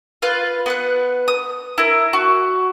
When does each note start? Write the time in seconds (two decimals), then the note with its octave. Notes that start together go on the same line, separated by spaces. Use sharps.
0.22 F4 B4 F5
0.66 B3 B4 F#5
1.28 D#6
1.78 E4 A#4
2.13 F#4